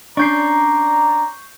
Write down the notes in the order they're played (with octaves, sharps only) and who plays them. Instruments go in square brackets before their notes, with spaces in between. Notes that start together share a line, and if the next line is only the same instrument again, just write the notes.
[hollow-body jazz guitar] C#4 D4 [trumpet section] D5 A#5 [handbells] C#6 G6 C7